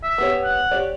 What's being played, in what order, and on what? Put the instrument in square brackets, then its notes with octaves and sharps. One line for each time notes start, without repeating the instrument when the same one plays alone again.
[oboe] E5
[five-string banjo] B3 G4 C#5
[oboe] F#5
[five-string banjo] G4 C#5 D5